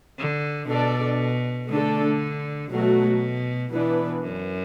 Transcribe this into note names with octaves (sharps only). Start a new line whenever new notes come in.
D3
B2 D4 A4 D5
D3 A3 D4 A4
B2 F#3 A3 F#4
B2 E3 B3 D4 B4
F#2